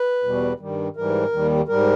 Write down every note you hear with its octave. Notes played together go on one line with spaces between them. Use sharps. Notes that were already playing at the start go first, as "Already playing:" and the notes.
Already playing: B4
E2 B2 G3
G2 D#3 G3
G#2 E3 G3 A#4
D#2 D#3 G3
G#2 G3 A#4